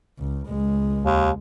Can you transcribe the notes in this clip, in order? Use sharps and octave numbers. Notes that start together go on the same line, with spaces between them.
C#2
C#2 G#3
D#2